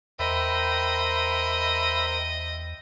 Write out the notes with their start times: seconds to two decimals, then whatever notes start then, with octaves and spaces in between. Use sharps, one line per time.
0.19 E2 A#4 C5 D#5 E5 G5 B5